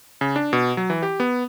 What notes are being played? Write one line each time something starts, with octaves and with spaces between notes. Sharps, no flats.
C#3
D4
B2
F#3
E3
G4
B3